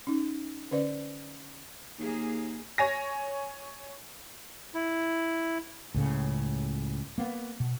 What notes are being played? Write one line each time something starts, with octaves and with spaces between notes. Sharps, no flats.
C#4 D#4
D3 C#4 B4 D5
D#2 A#3 G#4
C#5 G#5 A#6
E4
C#2 A2 C#3
A#3 B3
B2